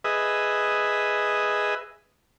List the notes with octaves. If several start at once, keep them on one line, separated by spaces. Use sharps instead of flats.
G#4 B4 D#5 E5